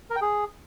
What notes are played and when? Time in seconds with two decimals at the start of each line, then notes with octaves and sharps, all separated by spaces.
0.10 A#4
0.16 G5
0.22 G#4